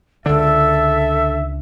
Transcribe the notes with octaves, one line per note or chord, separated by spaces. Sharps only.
C#2 D3 D4 A4 E5